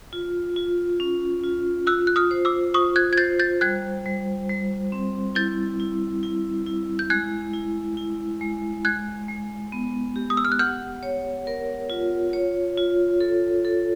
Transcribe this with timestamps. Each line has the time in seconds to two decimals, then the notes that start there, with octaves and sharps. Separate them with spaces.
0.13 F4
0.56 F4
1.00 C#4
1.44 F4
1.87 F4 E6 F#6
2.07 F#6
2.16 D#6 F6
2.31 C5
2.45 D6 E6
2.74 F4 C#6 D#6
2.96 F#6 G#6
3.13 G#6
3.18 C5 G6 A6
3.39 G6 A6
3.61 G3 F#6 G#6
4.05 G3
4.49 G3
4.92 C4
5.35 E4 G6 A6
5.80 E4
6.23 E4
6.66 E4
6.99 G6
7.10 G#3 F#6 G#6
7.54 E4
7.97 E4
8.41 G#3
8.85 G#3 F#6 G#6
9.28 G#3
9.72 B3
10.16 G4
10.30 D#6
10.37 E6
10.45 F6
10.52 F#6
10.59 F#5 F6 G6
11.03 C#5
11.47 A#4
11.90 F4
12.33 C#5
12.78 F4
13.21 A4
13.65 A4